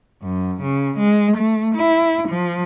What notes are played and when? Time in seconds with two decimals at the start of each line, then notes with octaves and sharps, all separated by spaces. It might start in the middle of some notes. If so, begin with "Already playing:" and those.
0.23 F#2
0.63 C#3
0.98 G#3
1.37 A3
1.76 E4
2.29 F3